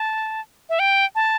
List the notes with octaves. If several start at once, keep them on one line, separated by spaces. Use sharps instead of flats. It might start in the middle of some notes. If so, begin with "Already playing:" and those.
Already playing: A5
E5
G5
A5